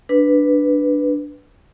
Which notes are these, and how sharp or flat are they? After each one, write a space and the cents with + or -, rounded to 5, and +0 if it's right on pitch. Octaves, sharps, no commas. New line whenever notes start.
D4 +0 B4 +0